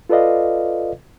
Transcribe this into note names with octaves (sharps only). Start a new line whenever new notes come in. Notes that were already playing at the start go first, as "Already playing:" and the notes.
F4 A4 B4 D5 D#5 F5